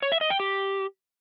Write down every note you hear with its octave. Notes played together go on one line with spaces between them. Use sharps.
C#5
E5
D#5
G5
G4